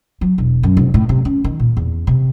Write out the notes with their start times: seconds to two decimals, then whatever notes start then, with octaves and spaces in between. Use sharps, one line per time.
0.21 F#3
0.38 E1
0.63 F#2
0.77 F1
0.94 A2
1.09 C3
1.25 C#4
1.44 D#3
1.60 A#2
1.77 E2
2.07 C3